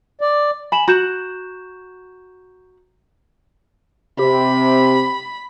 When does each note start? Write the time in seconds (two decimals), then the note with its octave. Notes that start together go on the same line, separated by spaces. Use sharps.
0.21 D5
0.72 G#5 B5 E7 F#7
0.88 F#4 A#5 G6 E7
4.19 C3 G4 B5